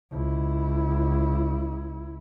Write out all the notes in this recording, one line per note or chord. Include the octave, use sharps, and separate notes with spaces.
C#2 E4